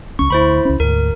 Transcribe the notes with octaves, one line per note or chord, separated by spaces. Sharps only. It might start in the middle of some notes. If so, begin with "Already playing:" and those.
C#2 C#4 C#6
D2 E4 C5 B5
C#2 C#4
D2 G#2 A#4